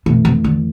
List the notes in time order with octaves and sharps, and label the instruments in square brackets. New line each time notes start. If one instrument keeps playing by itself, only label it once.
[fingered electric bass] F2 E3 A3 [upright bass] B2
[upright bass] C3
D3